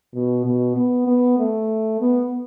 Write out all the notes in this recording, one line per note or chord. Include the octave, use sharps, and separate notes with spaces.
B2
B2
B3
B3
A3
B3